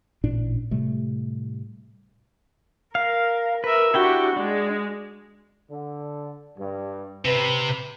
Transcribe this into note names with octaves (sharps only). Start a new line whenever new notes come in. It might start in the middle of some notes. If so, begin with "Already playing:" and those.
A1 A#2 D4
A2 C3 G3 A3
A#4 F5
A#4 B4 E5
D4 E4 F#4 G4 G5
G#3 D4
D3
G2
C3 B4